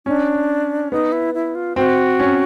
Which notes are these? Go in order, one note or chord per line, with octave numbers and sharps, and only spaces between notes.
C#4 D4
B3 D#4
E4
E4
F4
C4 F#4
C#4